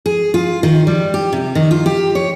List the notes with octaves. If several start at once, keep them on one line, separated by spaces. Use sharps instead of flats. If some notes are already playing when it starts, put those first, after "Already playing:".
G#4
F4
D#3
G3
G4
C3
D#3
F4
G4
C#5